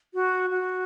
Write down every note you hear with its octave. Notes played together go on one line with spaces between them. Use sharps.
F#4
F#4